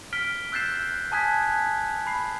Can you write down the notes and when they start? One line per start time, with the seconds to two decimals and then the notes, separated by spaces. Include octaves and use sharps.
0.13 F6 B6 D7 G7
0.52 E6 F#6 G6 A6 C7 E7
1.12 G#5 A5 D#6 F#6 G#6 B6
2.07 B5 C7